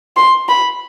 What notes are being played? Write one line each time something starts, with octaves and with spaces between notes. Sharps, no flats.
C6
B5